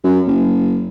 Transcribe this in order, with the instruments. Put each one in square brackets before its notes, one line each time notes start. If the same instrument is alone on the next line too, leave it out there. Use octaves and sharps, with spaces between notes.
[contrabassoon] F#2
F#1